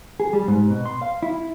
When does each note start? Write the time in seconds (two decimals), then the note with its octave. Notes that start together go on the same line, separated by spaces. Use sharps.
0.20 G#4
0.33 G3
0.48 G#2
0.70 B2
0.85 C6
1.02 F5
1.23 E4